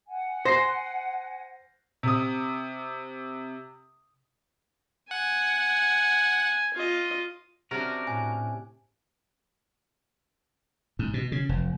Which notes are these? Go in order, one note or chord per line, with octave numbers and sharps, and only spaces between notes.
F#5 G#5
C5 A#6 C7
C3 D#6
F#5 G#5
F4 D#5
C3 C#4 D4 F#4 A#4
A2 G#5
G#2
B2
C#3
F1